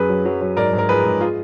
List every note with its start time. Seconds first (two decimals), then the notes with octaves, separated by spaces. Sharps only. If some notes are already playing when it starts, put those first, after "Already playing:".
Already playing: F#2 G#4 B4
0.09 F#3
0.25 F#3
0.41 F#3
0.56 G#2 A#4 D5
0.73 G#2
0.79 A#4
0.89 F3 G#4 B4
1.04 G#2
1.21 F4 G#4